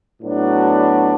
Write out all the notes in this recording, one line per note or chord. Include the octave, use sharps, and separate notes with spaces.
A2 F#3 B3 D4 F#4